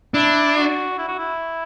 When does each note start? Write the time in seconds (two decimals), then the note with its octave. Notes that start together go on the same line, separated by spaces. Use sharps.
0.14 D4 E4
0.56 F#4
0.98 E4
1.08 F#4
1.18 E4